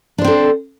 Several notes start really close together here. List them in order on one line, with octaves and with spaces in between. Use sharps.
D4 C5 C4 A4